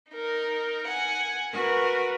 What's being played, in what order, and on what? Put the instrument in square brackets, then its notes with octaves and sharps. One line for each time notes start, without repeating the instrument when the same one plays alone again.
[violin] D#4 A#4
F#5 G#5
[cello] F#4 B4 [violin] A#4